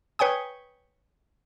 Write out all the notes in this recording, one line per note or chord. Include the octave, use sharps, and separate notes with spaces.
B4 C#5 G5 G#5 D#6